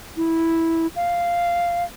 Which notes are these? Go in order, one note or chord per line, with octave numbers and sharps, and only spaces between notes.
E4
F5